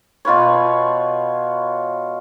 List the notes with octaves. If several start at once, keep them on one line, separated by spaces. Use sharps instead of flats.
B2 F4 B4 C#5